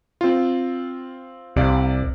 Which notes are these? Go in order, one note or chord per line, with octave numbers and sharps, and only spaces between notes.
C4 F4
C2 C3 D5 F5